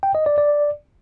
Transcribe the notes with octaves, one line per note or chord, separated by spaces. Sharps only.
G5
D#5
D5
D5